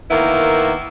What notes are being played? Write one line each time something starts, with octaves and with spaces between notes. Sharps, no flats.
D#3 A#3 B3 E4